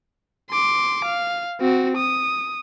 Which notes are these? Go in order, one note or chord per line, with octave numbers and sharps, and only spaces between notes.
C6 D6
F5
C4 F#4
D#6